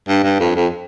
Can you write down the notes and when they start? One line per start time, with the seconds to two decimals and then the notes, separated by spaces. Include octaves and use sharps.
0.08 G2
0.24 G2
0.40 F2
0.56 F2